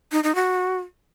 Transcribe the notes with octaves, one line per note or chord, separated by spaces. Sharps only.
D#4
D#4
F#4